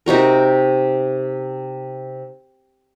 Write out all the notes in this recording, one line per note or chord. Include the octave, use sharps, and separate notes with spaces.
C3 D#4 F#4 A#4